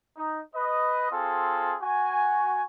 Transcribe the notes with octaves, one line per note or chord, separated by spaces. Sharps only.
D#4
B4 D#5
C4 F4 G#4 A4
F#4 G#5